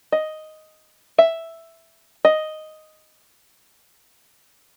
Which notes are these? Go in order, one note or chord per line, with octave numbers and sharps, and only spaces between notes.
D#5
E5
D#5